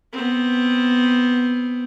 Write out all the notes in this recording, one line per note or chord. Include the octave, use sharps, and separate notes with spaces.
B3 C4